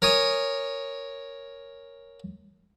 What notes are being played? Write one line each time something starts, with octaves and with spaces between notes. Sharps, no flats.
A#4 C#5 G#5 D#6